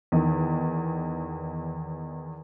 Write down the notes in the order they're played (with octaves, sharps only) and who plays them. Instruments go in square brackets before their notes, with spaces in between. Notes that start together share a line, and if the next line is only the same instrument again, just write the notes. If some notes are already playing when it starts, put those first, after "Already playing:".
[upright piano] E2 D#3